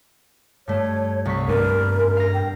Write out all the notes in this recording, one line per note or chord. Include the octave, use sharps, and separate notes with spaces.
G2 A3 C#5
C2 C#6 B6
G2 G3 B3 D4 A#4
F5 A#6
G5